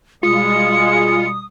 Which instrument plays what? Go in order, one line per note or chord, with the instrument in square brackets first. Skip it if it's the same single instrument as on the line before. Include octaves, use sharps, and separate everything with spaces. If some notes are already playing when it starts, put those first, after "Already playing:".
[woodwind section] B2 G3 D#6 [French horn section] G#3 [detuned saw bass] F4 [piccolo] C#7